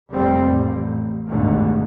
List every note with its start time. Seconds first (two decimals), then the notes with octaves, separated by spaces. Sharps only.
0.12 F1 F2 A#2 G3 C4
0.48 A1
1.28 G#1 D2 G2 B2